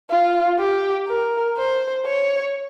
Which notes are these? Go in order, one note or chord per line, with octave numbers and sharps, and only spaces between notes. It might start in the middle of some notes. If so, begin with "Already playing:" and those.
F4
G4
A#4
C5
C#5